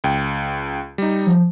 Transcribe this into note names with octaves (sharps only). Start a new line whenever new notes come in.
C#2 G5
G3 D#4
F3